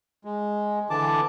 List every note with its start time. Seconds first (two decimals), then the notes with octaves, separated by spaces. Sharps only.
0.25 G#3
0.90 D3 E3 A5 D6